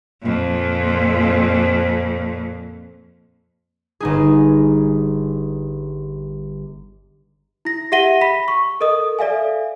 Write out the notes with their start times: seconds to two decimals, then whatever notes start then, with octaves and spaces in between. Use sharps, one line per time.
0.21 F2 A#2
4.00 G1 D#4 G#4
7.65 E4 A#6
7.92 G4 E5 F#5 A#6 D#7 G7
8.21 B5 B6
8.48 C#6
8.81 A4 A#4 D#5 D#6
9.19 A4 D5 E5 F5 G#5